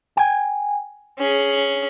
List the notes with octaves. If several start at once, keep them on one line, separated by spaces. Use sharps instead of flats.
G5 G#5
C#4 G#4